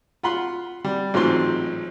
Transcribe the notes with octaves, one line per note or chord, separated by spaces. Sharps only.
F4 F#5 B5 C6
G3
A1 G#2 F3 F#3 C4 C6